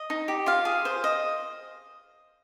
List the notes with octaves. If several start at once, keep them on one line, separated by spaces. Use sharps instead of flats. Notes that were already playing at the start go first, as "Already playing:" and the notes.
Already playing: D#5
D#4
G4
F4 F5
G#4
C5
D#5